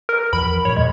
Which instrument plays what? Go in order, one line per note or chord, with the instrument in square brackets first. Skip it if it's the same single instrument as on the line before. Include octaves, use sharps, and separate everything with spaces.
[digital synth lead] A#4
[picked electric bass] E2 E3 F3 [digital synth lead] B5
[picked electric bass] G2 A#2 [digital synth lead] C#5
[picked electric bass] D#2 [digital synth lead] G#3